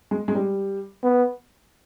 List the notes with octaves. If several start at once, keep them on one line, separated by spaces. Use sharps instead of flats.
G#3
G#3
G3
B3